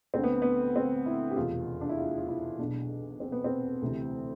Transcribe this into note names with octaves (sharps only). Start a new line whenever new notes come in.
D2 D3 C4
B3
B3
C4
E4
G4
F1 E2 B2 F4
D4
E4
F4
F4
E4
B1 B2 D4
C4
B3
C4
D2 C3 E3